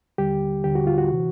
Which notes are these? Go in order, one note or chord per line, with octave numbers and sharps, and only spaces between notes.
D#2 D3 G3 G4
D#2 D3 G3 G4
F#4
F4
F#4
C3 E3